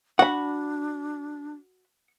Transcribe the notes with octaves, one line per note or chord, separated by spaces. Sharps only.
D4 F#4 F#5 B5